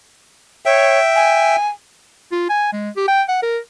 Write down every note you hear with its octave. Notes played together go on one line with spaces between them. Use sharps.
C#5 E5 G5
G#5
F4
G#5
G#3
G4
G5
F#5
A#4